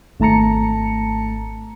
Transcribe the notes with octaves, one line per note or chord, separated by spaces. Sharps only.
G#1 A3 A5 A#5 C#7